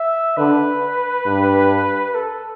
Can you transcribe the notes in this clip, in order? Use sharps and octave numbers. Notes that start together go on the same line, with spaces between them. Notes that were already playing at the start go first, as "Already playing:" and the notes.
Already playing: E5
D3 B4
G2
A4